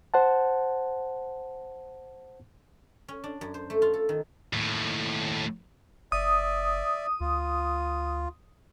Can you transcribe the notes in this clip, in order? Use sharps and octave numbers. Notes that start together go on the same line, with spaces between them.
C5 F#5 A5
C#4
D4
F#2
C5
A3
F4
A4
D#3
D#2 A2
F#1 D5 E5 D#6
D2 F4